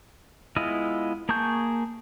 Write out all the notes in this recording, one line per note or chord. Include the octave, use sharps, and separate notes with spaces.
G#3 B3 E4 F4 D#5
A#3 G#4 A5 C#6 G6